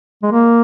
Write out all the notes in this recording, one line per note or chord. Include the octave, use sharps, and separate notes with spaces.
G#3
A#3